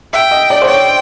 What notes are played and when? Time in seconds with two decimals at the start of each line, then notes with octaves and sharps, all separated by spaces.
0.13 E5 G5
0.31 D#5
0.50 D5
0.62 C5
0.68 C#5 G5